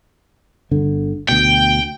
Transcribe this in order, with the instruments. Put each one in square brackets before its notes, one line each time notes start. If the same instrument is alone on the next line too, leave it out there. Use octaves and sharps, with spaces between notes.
[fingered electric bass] G1 D3
[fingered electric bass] D2 B2 [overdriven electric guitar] G5